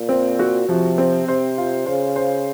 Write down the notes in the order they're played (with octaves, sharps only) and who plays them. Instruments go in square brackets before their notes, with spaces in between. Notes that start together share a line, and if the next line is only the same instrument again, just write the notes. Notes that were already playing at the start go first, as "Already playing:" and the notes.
Already playing: [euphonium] A#2
[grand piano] C4
F#4
[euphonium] C3 [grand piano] F3
[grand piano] C4
[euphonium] C3 [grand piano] C5
[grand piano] F4
[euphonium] C#3 [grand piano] C5
[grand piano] C5